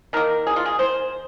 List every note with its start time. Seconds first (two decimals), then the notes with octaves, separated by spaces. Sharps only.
0.13 D#3 A#3 A#4
0.47 G#4
0.56 F4
0.66 G#4
0.79 C5